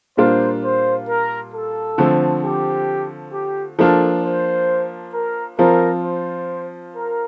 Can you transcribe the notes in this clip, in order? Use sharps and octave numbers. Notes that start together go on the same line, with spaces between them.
A#2 G3 A#3 D4 F4 C5
C5
A#4
A4
D3 F3 A3 C4
G4
G4
F3 A#3 D4 F4 A4
C5
A#4
F3 C4 F4 A#4
C5
A#4